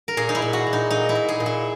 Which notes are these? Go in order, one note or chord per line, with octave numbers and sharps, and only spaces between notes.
A#4
A#2 G#4
D#4
E4
A#2
F#4
A#2
D#4
A#2 D#4
E4
A#2
G#4
A#2
E4